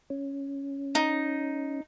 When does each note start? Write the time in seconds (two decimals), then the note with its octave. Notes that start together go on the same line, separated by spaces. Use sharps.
0.10 C#4
0.95 D#4